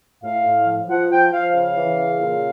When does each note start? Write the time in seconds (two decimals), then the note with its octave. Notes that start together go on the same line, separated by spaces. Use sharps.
0.23 A2 F5
0.46 A2
0.67 F3
0.89 F3 F#5
1.10 F3 G5
1.32 F3 F5
1.54 C#3 F5
1.76 E3
1.98 C#3
2.20 A#2